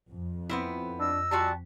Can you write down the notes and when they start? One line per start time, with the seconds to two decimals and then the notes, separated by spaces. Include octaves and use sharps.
0.12 F2
0.49 B3 C4 E4
0.99 D4 D#5 E6
1.31 G3 F4 F#4 A5